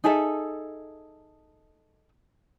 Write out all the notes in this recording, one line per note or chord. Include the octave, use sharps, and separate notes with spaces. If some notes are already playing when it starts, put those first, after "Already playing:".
D#4 G#4 A4 E5